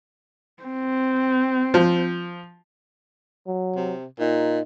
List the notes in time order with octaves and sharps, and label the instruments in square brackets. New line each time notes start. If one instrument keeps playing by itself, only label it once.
[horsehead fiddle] C4
[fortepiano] F3
[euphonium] F#3
[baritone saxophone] C3
[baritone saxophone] A#2 [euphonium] D#4